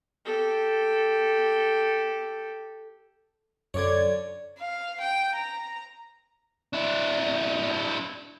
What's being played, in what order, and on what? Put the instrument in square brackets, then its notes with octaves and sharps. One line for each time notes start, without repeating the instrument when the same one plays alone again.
[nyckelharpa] G4 A4
[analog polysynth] F#2 D5 G#6 [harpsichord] D3 C#5
[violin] F5
G5
A#5
[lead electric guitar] D4 E4